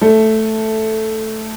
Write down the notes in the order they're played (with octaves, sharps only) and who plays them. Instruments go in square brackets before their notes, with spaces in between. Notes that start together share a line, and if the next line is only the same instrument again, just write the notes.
[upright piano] A3